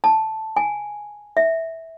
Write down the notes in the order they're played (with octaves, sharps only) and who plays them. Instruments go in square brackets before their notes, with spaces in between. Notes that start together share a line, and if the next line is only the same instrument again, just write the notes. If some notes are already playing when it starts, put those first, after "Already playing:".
[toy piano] A5
G#5
E5